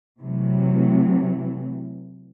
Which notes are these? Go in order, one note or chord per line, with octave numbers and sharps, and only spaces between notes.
C3 E3 F#3 A3